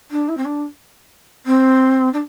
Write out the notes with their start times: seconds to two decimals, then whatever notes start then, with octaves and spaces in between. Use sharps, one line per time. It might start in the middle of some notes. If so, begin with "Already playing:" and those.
0.11 D4
0.28 E4
0.37 C4
0.45 D4
1.46 C4
2.13 D4